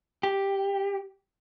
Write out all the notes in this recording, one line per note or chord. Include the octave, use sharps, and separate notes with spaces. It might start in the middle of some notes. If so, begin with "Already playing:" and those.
G4